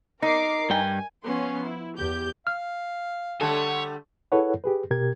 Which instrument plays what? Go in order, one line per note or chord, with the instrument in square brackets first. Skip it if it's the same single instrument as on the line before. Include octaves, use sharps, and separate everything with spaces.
[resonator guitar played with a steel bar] D#4 [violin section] A#4 D6 C7
[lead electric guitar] G2 G5 [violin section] G#5
[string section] F3 B3 C#4 C6
E4
E2 G4 G6
[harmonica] F5 [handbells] F6
[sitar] D3 G3 A3 [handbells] A4 A5 [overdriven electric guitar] C#5
[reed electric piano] E4 G#4 A4 B4 C#5 F#5
G4 G#4 B4
B2 G4 A#4 G#6